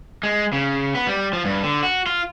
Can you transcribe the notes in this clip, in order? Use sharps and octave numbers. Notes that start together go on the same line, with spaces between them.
G#3
C#3
B3
G3
F3
G2
D3
F#4
F4